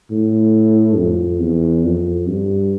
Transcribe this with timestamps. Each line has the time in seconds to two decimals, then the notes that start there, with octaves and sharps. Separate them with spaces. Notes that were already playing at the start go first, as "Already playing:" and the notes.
0.11 A2
0.98 F2
1.41 E2
1.85 F2
2.28 G2